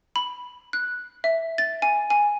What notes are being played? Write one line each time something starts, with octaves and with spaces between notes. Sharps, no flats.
B5
F#6
E5
A6
G#5
G#5